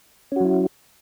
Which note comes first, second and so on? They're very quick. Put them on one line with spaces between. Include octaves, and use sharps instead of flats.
C#4 F#4 F#3 E4